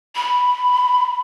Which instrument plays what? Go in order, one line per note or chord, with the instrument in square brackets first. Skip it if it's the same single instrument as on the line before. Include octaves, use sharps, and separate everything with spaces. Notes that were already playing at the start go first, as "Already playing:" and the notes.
[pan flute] B5